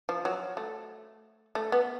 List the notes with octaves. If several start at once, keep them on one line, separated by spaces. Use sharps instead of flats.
F3
F#3
A3
A3
B3